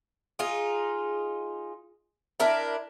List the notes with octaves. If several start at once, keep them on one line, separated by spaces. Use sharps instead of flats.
D#4 F4 G#4
D4 E4 A#4 E5